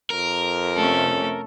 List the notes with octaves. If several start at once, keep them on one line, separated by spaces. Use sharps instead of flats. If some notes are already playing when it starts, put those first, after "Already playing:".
F2 A#4
C3 A3 C#4 A4